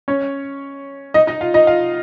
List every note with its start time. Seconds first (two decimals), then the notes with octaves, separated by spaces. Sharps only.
0.08 C#4 C#5
1.14 D#4 D#5
1.27 D#4 D#5
1.41 F4 F5
1.54 D#4 D#5
1.67 F4 F5